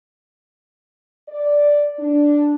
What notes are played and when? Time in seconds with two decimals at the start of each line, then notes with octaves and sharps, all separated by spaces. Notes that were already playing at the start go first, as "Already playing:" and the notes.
1.29 D5
1.99 D4